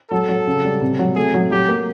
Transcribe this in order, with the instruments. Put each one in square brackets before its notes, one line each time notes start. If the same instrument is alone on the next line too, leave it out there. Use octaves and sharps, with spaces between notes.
[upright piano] F#3 [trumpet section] A4
[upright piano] F#3
C#3
G3
C3
F#3
[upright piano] A3 [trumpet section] G#4
[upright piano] F#3
[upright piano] F#3 [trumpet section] G4
[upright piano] A#3